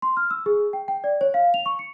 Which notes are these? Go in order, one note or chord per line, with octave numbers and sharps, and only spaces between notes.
C6
F6
E6
G#4
G5
G5
D5
C#5
F5
F7
C#6
C#7